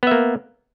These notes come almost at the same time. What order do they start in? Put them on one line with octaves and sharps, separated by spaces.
B3 E5 A#3